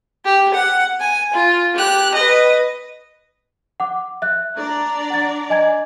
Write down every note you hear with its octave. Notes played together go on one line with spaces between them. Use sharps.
G4
F#5
G#5
F4
G4 F#6
B4 D#5
F#5 D6
E5 F#6
D4 D5 A#5
F#5 A6
D#5 G#5 G#6